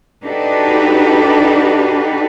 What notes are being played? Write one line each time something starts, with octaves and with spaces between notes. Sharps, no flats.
D4 D#4 F#4 G4 A4 B4